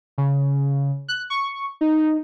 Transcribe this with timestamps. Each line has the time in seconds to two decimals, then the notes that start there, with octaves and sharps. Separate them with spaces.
0.18 C#3
1.08 F#6
1.30 C#6
1.81 D#4